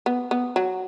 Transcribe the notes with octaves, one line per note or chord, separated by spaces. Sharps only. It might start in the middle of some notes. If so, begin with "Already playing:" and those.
B3
B3
F#3